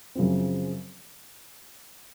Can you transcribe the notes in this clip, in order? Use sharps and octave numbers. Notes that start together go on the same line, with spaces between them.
F#2 C#3 F3 C4